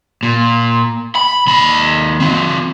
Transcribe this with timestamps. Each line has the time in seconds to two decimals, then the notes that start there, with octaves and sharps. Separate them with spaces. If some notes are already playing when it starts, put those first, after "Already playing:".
0.23 A#2
1.15 B5
1.47 D#2 B5
2.20 E3 C4